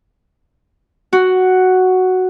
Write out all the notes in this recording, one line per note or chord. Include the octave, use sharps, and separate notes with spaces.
F#4